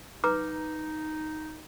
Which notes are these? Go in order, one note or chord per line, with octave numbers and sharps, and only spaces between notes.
D#4 B4 A#5 D6